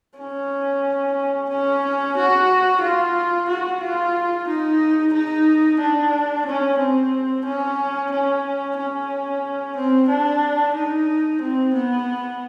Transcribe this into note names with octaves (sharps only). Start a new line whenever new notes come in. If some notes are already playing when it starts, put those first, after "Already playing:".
C#4
C#4
F#4
F4
F#4
F4
D#4
D#4
D4
C#4
C4
C#4
C#4
C#4
C4
D4
D#4
C4
B3